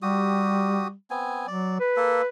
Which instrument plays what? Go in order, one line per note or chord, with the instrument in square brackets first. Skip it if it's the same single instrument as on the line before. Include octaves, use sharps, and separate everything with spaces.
[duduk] G3 [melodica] F#4 G4 D#6
[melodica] B3 C4 G#5
[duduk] F#3 [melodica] D5
[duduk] B4
[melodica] A#3 A4